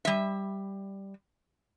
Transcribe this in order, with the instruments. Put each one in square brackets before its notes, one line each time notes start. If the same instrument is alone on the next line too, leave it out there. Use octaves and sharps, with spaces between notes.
[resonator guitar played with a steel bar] G3 E5